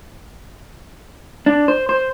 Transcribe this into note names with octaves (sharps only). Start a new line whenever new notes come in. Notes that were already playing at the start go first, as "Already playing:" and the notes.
D4
C5
C5